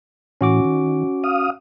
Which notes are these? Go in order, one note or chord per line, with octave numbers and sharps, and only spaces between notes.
A2 E3 C#4 F#4 D6
D#3
F5 D#6